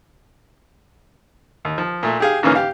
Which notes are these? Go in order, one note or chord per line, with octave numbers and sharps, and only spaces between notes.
D#2
F3
A#2 A3
G4 G#4 F5
G#2 C#3 E3 A#3 C#4 F4
G4 F5